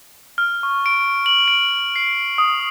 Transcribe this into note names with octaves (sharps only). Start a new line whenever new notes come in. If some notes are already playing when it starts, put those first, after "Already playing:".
F6
C#6
D7
F#7
D7
C7
D#6